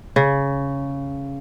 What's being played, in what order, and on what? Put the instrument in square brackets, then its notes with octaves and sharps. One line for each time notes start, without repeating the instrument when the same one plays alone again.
[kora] C#3